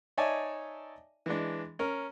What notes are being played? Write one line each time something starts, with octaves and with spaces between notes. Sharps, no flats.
D#4 C#5 D5 E5 G#5 A5
E3 G#3 D4
C#4 A#4